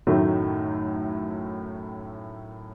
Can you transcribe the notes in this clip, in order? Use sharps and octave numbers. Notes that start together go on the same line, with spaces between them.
F#2 A2 D#3 F#3 A3 D#4